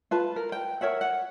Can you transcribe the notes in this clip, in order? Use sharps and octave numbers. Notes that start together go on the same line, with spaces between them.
F4 B4 A5
A#4
G5
A#4 C#5 E5 F#5
F#5